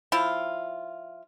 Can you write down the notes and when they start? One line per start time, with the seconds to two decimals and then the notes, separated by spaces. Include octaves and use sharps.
0.12 F3 E4 F4